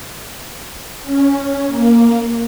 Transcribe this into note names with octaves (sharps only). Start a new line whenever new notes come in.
C#4
A#3